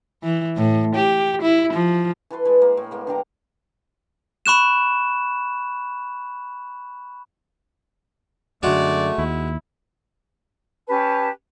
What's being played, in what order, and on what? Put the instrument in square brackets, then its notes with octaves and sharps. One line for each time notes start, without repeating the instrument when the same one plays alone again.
[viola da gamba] E3
A2
G4
E4
F3
[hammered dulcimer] E3 A4 B4 C6
E3 G#3
A#3
A2
G#3 A#3 B3
D3 G4 A#5 D6
[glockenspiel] B5 C#6 F#6 E7
[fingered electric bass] F#2 D3 [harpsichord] G#3 F#4 [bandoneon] A3 [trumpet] D5
[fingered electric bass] D#2 [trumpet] E4
[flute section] C#4 G4 B4 A5